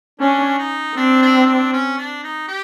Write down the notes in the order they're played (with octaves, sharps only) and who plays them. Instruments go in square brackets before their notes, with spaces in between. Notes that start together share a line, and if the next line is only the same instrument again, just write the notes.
[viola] C#4 [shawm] D4
[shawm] D#4
[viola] C4 [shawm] D4
[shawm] D4
D4
C#4
D4
D#4
G4